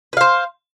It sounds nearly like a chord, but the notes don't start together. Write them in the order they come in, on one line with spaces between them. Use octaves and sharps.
B4 F5 C5